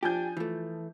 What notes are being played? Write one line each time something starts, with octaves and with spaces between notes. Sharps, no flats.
F3 D4 G4 G#5 G6
E3 F3 A3